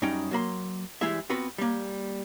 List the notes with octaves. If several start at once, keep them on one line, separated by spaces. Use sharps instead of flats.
F#2 G3 C#4 D#4 G5
F#3 A#3 B5 C6
E3 G3 G#3 E4 G#4 E5
B3 C4 F4 F#4 B4
G3 A#3